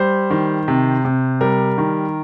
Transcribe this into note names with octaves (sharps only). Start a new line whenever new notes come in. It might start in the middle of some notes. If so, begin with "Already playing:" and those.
Already playing: G3 C5
D#3
C3
C3
G3 A#4
D#3